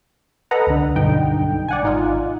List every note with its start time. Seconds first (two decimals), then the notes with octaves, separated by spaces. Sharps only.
0.51 A4 B4 D#5 F#5 A#5
0.67 C#2 D3
0.96 B1 G2 D3 D#4 G5
1.68 D5 F#5 G#5
1.83 G#1 D#4 F4